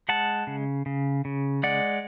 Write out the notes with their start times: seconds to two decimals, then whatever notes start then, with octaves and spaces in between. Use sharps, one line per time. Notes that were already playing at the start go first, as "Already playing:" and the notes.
0.09 G#3 F#5 A5
0.47 C#3
0.86 C#3
1.25 C#3
1.63 G#3 D5 F#5